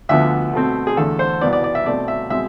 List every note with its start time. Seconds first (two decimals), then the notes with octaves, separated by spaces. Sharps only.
0.09 D2 D3 F3 B3 E5
0.53 B2 A3 C4
0.87 G#4
0.97 E2 D3 A3 A4
1.19 C5
1.41 C2 B2 B3 D5
1.53 D5
1.64 D5
1.75 E5
1.86 B2 A3 C4 D5
2.08 E5
2.30 B2 G#3 C4 E5